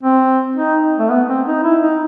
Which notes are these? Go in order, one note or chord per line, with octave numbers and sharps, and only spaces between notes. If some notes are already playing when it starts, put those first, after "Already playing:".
C4
D#4
A3
B3
C4
D#4
E4
D#4